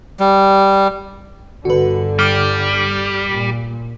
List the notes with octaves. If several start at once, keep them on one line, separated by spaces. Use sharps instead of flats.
G3
G1 D3 F#4 B4
G3 D6 F6
A#2